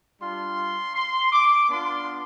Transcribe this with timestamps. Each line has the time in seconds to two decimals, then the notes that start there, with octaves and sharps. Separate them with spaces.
0.20 G3 D4 F4 C6
0.95 C6
1.32 D6
1.69 B3 D4 F4 C6